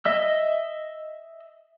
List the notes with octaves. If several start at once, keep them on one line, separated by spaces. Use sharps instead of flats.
D#5 E5 E6